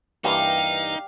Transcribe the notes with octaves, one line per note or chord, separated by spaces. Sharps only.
G2 E3 A#3 D#4 G4 D5 F5